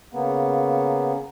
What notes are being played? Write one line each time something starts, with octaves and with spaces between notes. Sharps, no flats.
C#3 A#3 B3